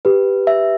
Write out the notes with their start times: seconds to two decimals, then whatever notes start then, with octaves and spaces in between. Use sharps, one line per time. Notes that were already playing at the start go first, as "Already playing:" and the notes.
0.05 G4 B4
0.47 E5